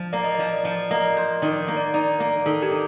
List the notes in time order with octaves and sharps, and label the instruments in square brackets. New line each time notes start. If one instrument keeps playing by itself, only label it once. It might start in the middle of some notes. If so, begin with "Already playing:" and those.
Already playing: [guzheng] F3
[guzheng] A#3 [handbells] D5
[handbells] D#5
[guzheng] F3 [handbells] D5
[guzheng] F3
[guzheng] A#3 [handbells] D#5
[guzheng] C5
[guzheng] D#3 [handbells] D5
[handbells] D5
[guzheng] A#3
[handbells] D5
[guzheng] D#4 [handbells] D5
[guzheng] A#3
[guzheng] D#3 [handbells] A4
[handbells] G4
[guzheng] D#4